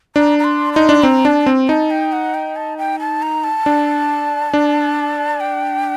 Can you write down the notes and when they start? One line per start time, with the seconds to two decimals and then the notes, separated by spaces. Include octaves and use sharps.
0.16 D4 A#5
0.39 A#5
0.44 C6
0.73 D#4 C6
0.89 D4
1.03 C4 A#5
1.25 D4 A5
1.46 C4
1.68 D#4 A5
1.91 G5
2.12 F#5
2.34 G5
2.56 A5
2.78 G5
3.00 A5
3.22 A#5
3.44 A5
3.66 D4
4.53 D4
5.41 G5